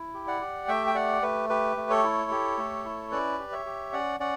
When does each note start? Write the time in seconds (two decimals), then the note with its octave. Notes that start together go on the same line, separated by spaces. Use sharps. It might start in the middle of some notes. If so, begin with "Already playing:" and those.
Already playing: E4
0.14 G4
0.27 D5 F#5
0.41 G4
0.68 A3 E5 G5
0.87 G5
0.95 G4 D5 F#5
1.22 A3 B4
1.49 G4 B4
1.77 A3
1.90 A4 C#5
2.04 E4
2.31 G4
2.58 A3
2.85 E4
3.11 C#4 B4 D5
3.39 G4
3.52 C#5 E5
3.66 G4
3.93 C#4 D5 F#5
4.20 C#4 D5 F#5